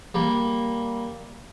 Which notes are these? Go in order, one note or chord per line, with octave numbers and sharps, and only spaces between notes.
G3 A#3